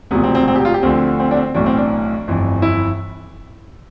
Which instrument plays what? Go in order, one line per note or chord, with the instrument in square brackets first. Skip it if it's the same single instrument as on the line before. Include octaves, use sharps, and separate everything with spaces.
[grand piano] E1 D2 C3 F3 B3
C4
C4
C4
G4
F4
G4
D2 D3 F3 C4
C4
D4
C4
B1 A2 E3 D4
C4
D4
G1 F2 E3
E4